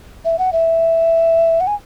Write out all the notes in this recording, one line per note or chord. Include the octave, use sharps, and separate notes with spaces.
E5
F#5
E5
F#5
G#5